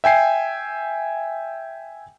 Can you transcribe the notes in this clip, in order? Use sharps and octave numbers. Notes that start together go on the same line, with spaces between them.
E5 G5 G#5 C7